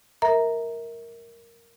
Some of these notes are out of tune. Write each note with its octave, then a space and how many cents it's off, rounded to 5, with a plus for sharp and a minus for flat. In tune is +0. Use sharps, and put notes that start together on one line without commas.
A#4 +0 E5 -30 A#5 +0